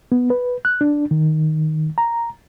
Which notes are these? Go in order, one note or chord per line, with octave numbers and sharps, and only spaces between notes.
B3
B4
F#6
D4
D#3
A#5